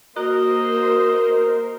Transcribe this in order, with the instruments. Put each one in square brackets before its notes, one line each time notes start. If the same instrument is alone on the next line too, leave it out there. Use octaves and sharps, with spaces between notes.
[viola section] A#3 C5 [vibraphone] F#4 [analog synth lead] A#4 [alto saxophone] D#5